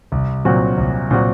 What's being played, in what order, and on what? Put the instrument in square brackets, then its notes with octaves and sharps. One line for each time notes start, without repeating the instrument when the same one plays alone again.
[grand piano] C2
A#2 F#3 C4 F#4
C2
A#2 F#3 C4 F#4